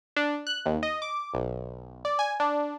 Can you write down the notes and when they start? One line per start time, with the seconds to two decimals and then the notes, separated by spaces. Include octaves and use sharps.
0.16 D4
0.47 F#6
0.66 D#2
0.83 D#5
1.02 D6
1.34 B1
2.05 D5
2.19 G#5
2.40 D4